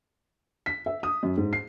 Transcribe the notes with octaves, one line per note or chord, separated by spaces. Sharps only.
B6
E5
D#6
F#2
G#2
C7